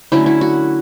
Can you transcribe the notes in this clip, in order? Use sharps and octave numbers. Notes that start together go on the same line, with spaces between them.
D3 F#3 A3 C#4 E4
E4
F#4